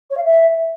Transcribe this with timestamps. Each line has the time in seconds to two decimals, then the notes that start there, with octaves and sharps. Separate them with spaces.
0.10 C#5
0.17 F5
0.24 E5